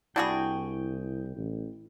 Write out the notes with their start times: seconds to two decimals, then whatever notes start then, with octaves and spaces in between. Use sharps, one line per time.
0.16 C2 D4 E4 F#4 G#4 G5
1.36 A1